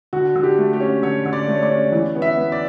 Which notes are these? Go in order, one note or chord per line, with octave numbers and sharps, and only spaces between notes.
D3 F#4
D3
G4
A3
G4
C#4
D3 C#5
D3
D5
A3
C#5
D5
C#4
E3
B3
E5
B3
D5